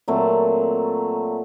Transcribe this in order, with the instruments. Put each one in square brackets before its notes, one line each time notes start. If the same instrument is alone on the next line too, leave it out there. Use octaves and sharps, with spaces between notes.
[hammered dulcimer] A#2 F#3 A3 C4